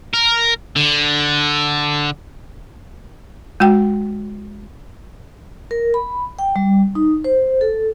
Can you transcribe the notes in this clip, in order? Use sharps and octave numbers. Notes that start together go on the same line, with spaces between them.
A#4
D3
G#3 F#4 G5
A#4
B5
G5
G3
D#4
C5
A4